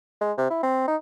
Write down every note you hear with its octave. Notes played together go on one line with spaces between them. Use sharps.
G#3
C3
E4
C4
D#4